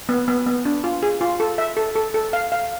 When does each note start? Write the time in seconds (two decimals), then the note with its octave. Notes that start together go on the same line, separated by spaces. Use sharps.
0.09 B3
0.28 B3
0.46 B3
0.65 D4
0.84 F4
1.03 G#4
1.21 F4
1.40 A4
1.58 E5
1.77 A4
1.96 A4
2.14 A4
2.33 F5
2.52 F5